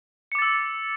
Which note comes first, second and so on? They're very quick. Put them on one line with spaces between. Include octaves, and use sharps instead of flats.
C#7 D6 A6 E6